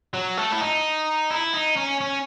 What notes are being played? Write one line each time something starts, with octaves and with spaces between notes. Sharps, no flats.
F#3
A3
E4
D#4
E4
D#4
C#4
C#4